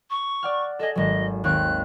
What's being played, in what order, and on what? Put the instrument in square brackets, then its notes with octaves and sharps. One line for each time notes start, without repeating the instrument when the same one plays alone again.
[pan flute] C#6
[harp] D5 F#5 F6
[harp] G#4 A4 [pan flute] D#5
[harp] G#1 F#3 [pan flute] D#5
[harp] D#2 C4 C#6 [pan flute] F#6